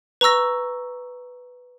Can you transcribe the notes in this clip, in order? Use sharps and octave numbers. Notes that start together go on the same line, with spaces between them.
B4 A#5 C#6 E6 A#6